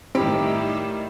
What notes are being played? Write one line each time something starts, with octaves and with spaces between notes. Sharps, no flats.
A2 D#3 G3 C4 E4 G4